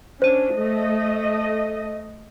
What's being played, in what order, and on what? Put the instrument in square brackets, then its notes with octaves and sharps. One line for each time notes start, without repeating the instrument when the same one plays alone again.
[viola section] C#4 D4 [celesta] C5 D#7
[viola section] A3 D#5